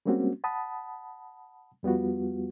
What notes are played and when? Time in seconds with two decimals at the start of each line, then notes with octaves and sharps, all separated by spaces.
0.06 G3 G#3 A#3 C4 C#4 F#4
0.44 F#5 A5 B5 D#6
1.83 F2 G3 B3 F4 F#4